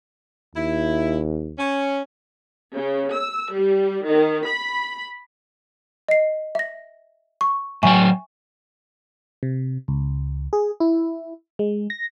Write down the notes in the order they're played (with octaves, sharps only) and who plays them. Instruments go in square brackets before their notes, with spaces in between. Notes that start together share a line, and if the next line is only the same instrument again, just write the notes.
[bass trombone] D#2 [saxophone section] E4
[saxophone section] C#4
[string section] C#3
E6
G3
D#3
B5
[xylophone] D#5 C7
E5 A#6
C#6
[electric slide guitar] A2 F#3 G5 [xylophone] E5 G#5 C#6
[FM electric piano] C3
C#2
G#4
E4
G#3
A#6